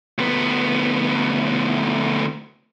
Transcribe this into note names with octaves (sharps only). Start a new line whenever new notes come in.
D2 B3